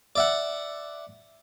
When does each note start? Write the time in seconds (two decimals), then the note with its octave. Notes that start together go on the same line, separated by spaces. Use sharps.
0.16 D5 E5 F#5